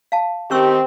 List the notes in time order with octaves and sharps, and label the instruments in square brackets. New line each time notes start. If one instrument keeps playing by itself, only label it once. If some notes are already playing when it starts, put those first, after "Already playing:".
[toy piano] F5 A5
[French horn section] D#3 G4 [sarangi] C4 [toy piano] C#4 C#6 E6